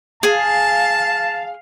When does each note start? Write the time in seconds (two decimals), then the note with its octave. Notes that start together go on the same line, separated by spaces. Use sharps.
0.23 G#4 F5 G#5 A5